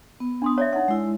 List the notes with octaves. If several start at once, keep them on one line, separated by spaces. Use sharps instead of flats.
B3
D4 C6 D#6
C#5 D5 E5
D#4 C#5 F#5
G#3 E4